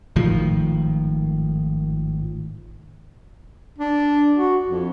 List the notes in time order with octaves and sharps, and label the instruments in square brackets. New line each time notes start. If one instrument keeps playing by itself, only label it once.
[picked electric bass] G#1 A2 D#3 F3
[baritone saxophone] D4
F#4
F2